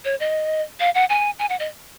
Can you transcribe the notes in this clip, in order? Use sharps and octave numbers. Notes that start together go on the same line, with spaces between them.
C#5
D#5
F5
F#5
G#5
G#5
F#5
D#5